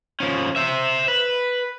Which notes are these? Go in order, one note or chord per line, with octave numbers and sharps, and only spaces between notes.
F3 C#4
C5 E5
B4